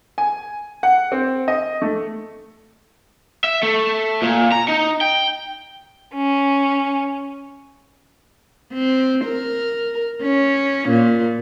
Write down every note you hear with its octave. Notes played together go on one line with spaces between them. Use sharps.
G#5
F#5
C4
D#5
A3
E5
A3
A#2
A#5
D#4
G5
C#4
C4
A#4
C#4
A#2